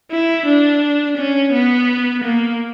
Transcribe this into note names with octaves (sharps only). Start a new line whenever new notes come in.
E4
D4
C#4
B3
A#3